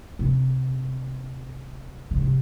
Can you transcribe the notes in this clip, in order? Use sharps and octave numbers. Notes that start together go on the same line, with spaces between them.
C3
C#3
C3